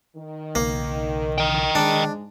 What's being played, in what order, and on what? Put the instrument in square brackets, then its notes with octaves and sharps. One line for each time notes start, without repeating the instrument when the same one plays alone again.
[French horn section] D#3
[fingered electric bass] B1 C#3 [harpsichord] A#3
[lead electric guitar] D#5 G5
[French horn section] G#2 G#3 [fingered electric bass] D#3 [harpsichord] D4